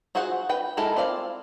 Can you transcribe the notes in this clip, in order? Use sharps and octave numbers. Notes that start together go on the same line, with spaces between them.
F4 F#4 G#4 C5 F#5
B4 G5
G#3 E4 A4 A#4
C4 F4 D5 F5